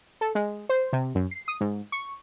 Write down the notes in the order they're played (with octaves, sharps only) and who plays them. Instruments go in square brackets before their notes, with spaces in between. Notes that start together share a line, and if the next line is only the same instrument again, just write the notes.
[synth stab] A4
G#3
C5
C3
F#2
C7
D#6
G#2
C#6